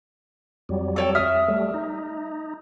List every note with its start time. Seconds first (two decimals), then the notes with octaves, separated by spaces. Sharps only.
0.69 F2 F#3 G3
0.96 A4 C#5 G5
1.15 E5 D#6 F6
1.48 G3 A3
1.74 D#4